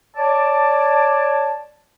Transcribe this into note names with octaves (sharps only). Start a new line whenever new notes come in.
C#5 D5 A5